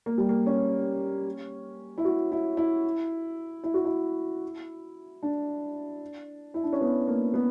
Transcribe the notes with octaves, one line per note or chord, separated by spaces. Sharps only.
A#3
G3
A#3
C#4
E4
F#4
E4
E4
E4
F#4
E4
D4
E4
D4
C#4
B3
A#3
B3